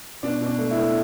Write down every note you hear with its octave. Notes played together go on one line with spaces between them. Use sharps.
B2 D4
B2
D4
A3
E4
A3